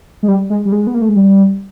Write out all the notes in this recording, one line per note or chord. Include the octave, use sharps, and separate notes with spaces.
G#3
G3
G#3
G3
G#3
B3
A#3
A3
G#3
G3